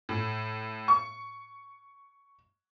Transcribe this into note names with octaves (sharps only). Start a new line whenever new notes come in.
A2
C#6